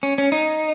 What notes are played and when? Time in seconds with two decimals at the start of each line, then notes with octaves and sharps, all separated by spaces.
0.03 C#4
0.18 C#4
0.32 D#4